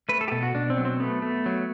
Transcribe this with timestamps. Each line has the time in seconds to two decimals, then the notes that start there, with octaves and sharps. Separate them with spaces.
0.09 A3 B4
0.21 A4
0.28 G4
0.32 B2 A4
0.43 F#4
0.55 B2 D4
0.70 C4
0.77 F#3
0.85 C4
1.00 A3 B3
1.22 A3
1.46 F#3